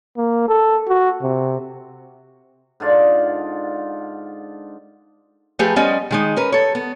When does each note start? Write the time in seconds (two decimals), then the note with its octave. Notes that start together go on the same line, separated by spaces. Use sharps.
0.17 A#3
0.49 A4
0.89 F#4
1.22 C3
2.80 G#2 D3 F4 D5
5.59 F3 A3 G4 G#4 B4
5.76 G3 B3 C#4 C5 D5 D#5
6.11 D#3 G#3 D#4
6.36 C#4 A#4 B4
6.52 A4 C#5
6.75 B3